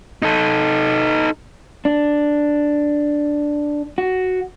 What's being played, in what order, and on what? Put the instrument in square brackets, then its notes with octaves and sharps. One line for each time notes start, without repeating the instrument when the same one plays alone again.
[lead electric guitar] D#4 A4
[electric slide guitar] D4
F#4